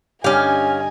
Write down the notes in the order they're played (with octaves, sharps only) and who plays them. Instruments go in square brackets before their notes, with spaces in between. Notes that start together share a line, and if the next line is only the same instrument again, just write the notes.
[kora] G2 D3 G4 [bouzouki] C#4 F5 [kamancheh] D#5 G#5